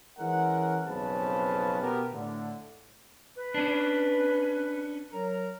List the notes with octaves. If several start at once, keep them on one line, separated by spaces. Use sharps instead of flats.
E3 G#3 C#4 A#4 F#5
B1 F2 C#3 B4 C5 A5
B2 B3 G4 A#4
A2 D3
B4
C#4 D4
F#3 A#4 A#5